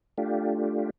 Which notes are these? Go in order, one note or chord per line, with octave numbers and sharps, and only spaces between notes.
A3 D4 F4 G4